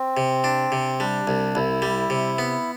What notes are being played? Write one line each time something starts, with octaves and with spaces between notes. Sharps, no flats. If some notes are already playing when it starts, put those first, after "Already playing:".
Already playing: C4
C3
D4
C3
G3 D4
C2
C2 E4
G3
C3
B3